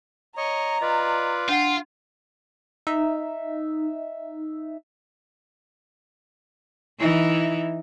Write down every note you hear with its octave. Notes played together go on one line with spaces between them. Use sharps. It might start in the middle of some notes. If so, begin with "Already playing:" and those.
C#5 D#5 A#5
F4 B4 D5 D#5
D4 F4 F#5 C7
D#4 E5
E3 D#4 E4